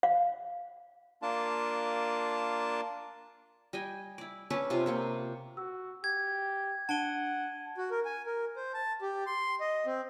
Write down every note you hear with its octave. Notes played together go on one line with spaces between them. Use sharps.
F5
A#3 D4 F4 A5
G3 D#5 G5 G#5
E4 D5
C#4 D4 B4 E5
C3 F4
C3 A#3 C4
F#4 E6
G4 G#6
D4 F#5 A5 D7 D#7 G7
F#4
A#4
G#5
A#4
C5
A5
G4
C6
D#5
C4